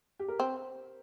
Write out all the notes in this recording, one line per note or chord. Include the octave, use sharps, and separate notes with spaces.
G4
A#4
C4 C5